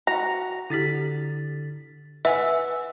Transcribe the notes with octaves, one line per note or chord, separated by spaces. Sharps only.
F#4 F#5 A#5
D3 E4 G4 A6 B6
B4 E5 F#5 G#5 E6